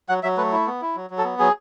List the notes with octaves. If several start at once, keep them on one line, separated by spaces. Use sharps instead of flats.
F#3 F#5
F#3 E5
A3 B4
E4
B3
E4
F#3
F#3
A4
B3
F#3 G#4